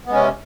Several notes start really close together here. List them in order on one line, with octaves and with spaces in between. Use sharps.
B3 G#3 C#4 C3